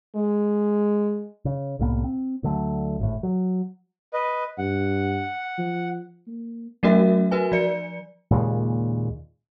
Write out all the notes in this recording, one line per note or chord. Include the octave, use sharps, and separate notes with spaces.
G#3
C#3
C2 A2 A#3 B3
C4
D2 D3 F#3 A3
G#1 A2
F#3
B4 D#5
G2 F#5
F3
A#3
F#3 A3 C#4 F#4 A#4 E5
F#4 A#4 B4 G#5
F3 D5 C#7
D#2 A#2 C#3 G#3